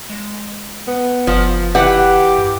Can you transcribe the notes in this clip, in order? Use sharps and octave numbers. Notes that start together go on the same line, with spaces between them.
G#3
B3
F#1 F3
E3 G4 B4 F#5
G2